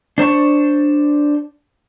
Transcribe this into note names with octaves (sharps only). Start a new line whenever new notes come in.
D4 C5 A5 C#6